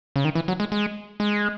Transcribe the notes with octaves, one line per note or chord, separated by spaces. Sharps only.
C#3
D#3
E3
F#3
G#3
G#3
G#3